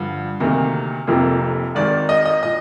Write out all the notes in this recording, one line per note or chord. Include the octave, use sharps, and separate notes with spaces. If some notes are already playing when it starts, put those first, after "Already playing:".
Already playing: G2 D3 F3
D2 C3 D#3 A#3
F1 F2 C3 F3 A#3
G#1 G#2 D#3 D5
D#5
D#5
A#2 D#5